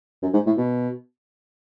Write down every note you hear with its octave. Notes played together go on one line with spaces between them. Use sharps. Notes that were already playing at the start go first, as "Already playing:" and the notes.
F#2
G#2
A2
B2